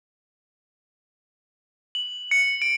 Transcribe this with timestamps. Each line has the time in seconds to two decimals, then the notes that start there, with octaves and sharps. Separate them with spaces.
1.95 F#7
2.31 C#7
2.62 D7